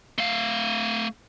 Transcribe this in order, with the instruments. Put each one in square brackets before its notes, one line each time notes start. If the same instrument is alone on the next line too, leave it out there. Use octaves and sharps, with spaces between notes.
[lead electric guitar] A3 F5